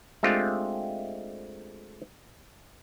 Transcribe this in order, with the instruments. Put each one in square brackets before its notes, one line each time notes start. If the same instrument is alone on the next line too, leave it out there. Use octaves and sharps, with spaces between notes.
[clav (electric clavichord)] G#3 A3 C4 D4 F4 G4